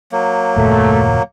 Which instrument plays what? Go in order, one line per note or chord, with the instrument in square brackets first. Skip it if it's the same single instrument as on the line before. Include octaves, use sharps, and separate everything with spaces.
[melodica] F#3 A#3
[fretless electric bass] F#1 D#2 A#2 [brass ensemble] A3